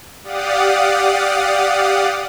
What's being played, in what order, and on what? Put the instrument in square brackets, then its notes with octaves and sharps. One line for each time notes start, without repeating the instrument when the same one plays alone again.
[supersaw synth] G4 D5 F5 F#5 D#6